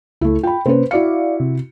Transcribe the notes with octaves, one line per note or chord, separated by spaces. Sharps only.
C#2 A3 E4
F4 G5 B5
C3 A#3 C#4 B4 C5
E4 F#4 D5 F5 C#7
C3